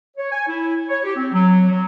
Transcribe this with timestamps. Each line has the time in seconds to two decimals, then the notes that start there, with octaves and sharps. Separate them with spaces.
0.17 C#5
0.32 G#5
0.48 E4
0.89 C#5
1.04 G4
1.16 C4
1.33 F#3
1.70 F#3